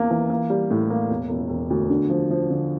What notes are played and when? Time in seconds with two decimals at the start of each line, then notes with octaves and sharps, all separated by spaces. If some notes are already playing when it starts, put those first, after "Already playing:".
Already playing: E2 A#3
0.10 E3
0.30 A#3
0.50 G3
0.71 A2
0.90 A#3
1.10 E1
1.30 E1
1.49 E1
1.70 D2
1.90 D3
2.10 F3
2.30 F3
2.50 D3